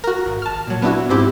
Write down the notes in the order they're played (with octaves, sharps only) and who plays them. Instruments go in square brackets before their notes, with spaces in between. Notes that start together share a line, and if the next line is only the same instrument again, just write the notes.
[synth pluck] F#4 A#4
G#1
A5 F6
A#2 F#3
B3 D4 E4 F#4
G#2 C4 E4 G4